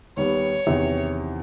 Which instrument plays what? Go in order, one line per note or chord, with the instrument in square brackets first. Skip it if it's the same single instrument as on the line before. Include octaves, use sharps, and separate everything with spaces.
[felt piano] D#2 G3 B3 [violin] C#5
[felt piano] E2 C3 D#3